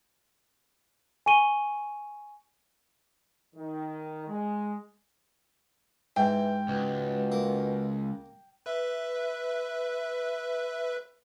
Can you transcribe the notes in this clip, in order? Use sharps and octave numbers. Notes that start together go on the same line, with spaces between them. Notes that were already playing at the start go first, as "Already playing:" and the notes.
G#5 C#6 D#7 G7
D#3
G#3
G#2 E3 G5
C#2 B2
A#3
B4 E5